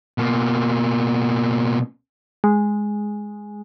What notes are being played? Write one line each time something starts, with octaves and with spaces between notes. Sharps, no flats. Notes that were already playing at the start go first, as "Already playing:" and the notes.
B2 A#3
G#3